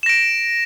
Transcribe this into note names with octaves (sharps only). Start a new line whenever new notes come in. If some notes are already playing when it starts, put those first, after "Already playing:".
A#6 D7 E7